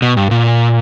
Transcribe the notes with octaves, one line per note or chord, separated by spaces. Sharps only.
B2
G2
A#2